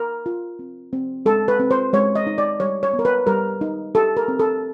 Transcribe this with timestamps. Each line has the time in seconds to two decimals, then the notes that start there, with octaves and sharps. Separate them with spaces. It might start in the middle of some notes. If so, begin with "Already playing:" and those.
Already playing: A#4
0.26 F4
0.59 C4
0.93 C4
1.26 G#3 A4
1.48 B4
1.59 C4
1.71 C5
1.93 G#3 C#5
2.16 D#5
2.27 D#4
2.38 D5
2.60 G3 C#5
2.83 C#5
2.93 B3
2.99 A#4
3.05 B4
3.27 G3 A#4
3.61 D#4
3.95 G4 A4
4.17 A#4
4.28 C4
4.39 A4